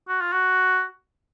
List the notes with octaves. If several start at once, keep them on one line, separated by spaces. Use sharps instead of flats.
F#4
F4
F#4